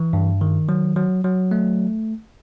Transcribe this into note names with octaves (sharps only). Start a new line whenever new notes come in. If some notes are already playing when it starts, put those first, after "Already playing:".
Already playing: E3
G2
D#3
F#3
F#3
F#3
A3